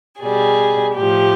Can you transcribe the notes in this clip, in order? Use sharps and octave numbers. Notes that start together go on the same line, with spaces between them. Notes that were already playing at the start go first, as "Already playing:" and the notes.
B2 G3 G#4
A2 F3 G4